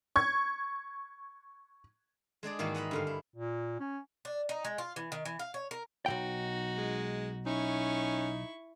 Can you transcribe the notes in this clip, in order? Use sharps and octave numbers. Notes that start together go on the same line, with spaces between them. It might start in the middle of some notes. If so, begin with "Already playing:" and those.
C#6 G#6
G#3 D4 G#4 D5
G#2 D#3 E3 A#3 F#4
D#5 F#5 A#5 B5
G2 D3 F5
E4
A#2
C#4
D4
D#4
G#3
F4
E3
D#3
E3
F5
C#5
A#4
B1 A#2 D#4 F#4 G5
G#3
C#4 D#4 E4 C#6